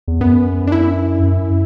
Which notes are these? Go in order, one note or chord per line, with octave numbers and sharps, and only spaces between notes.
E2
F#2 B3
D4
E4
F#2